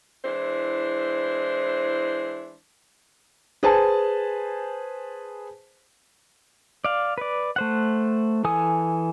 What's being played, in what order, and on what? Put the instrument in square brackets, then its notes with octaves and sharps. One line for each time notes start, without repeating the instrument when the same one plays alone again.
[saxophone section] E3 G#3 D4 E4 C5
[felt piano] G#4 B4 C5 G#5 A5
[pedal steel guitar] D5 F5
B4 D5
A3 C5 F#5
E3 A4 G#5 D#6